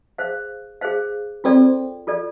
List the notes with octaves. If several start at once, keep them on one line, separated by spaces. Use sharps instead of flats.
G#4 C5 F5
G#4 C5 F5
C4 F4 A4 D5
F4 A4 D5